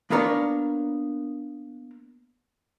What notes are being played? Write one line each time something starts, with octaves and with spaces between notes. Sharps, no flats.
A#3 B3 D4 A#4 C#5 D5